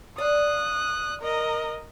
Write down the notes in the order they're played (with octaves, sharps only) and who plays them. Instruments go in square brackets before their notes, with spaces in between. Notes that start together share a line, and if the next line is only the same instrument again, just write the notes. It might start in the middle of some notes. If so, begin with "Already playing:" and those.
[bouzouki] D5 F5 [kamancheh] D#6 F#6
[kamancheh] A#4 D#5